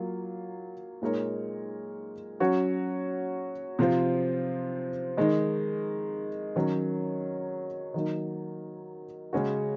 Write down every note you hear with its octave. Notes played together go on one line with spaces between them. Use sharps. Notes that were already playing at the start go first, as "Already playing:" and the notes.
Already playing: F#3 A#3 F4
A#2 G#3 D#4 A#4 C#5
F#3 C#4 F#4 C#5
C3 F3 C4 F4 C5
D#3 G#3 D#4
D#3 F#3 C#4
D#3 F#3 A#3 D#4
C#3 G#3 C#4 F#4